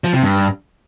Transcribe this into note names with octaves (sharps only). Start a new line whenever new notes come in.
F3
C3
G2